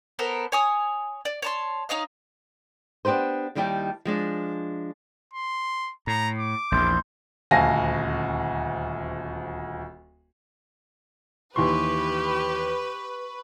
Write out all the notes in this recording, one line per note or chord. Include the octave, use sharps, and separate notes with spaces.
B3 A4 A#4 C5
C#5 G#5 D#6
D5
C#5 A5 C6
D#4 C#5 D#5 F5
B3 D4 G4 B4 C5
D#2 D#3 G3 E4 G4 A5
F3 G#3 D4
C6
A2 A#5
D6
A#1 E2 C6 G6
D#1 D2 F5 G#5 A5 A#6
D#2 E3 G4 B4 C6 C#6